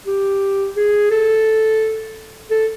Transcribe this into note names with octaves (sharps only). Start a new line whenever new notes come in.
G4
G#4
A4
A4